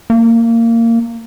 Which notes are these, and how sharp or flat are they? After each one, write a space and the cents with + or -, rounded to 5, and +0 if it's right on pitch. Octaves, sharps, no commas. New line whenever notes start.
A#3 -20